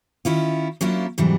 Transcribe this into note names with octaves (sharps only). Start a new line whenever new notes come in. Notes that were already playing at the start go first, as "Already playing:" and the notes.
D#3 C#4 E4 F4
F#3 A#3 C#4 D4 E4 F4
G#2 C3 E3 F#3 G3